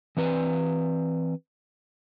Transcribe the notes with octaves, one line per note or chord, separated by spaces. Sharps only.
E3 C4 B4